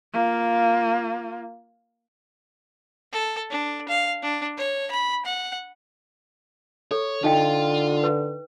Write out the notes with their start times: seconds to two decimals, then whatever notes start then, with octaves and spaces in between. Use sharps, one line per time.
0.13 A#3 F4
3.12 A4
3.50 D4
3.89 F5
4.22 D4
4.58 C#5
4.91 B5
5.25 F#5
6.91 A4 C#5
7.24 D3 D#4 F4 D#5 G5
8.04 B4